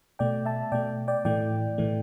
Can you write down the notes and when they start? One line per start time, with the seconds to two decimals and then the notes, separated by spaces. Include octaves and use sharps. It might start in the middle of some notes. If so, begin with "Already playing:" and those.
0.19 B2 A3 D5 G5
0.45 E5 A5
0.72 B2 A3 D5 G5
1.08 D5 G5
1.25 A2 E3 A3 D5 G5
1.78 A2 E3 A3